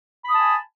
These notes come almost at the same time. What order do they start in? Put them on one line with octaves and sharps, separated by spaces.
B5 D#6 A5 G#5